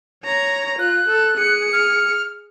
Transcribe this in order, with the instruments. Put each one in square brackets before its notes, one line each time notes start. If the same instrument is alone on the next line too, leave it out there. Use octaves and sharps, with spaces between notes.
[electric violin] C#5 A#5
[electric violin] F4 [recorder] F#6
[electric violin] A4
G#4 C#7
[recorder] F6